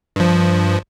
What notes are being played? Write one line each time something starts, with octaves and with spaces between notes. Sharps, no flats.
G2 F3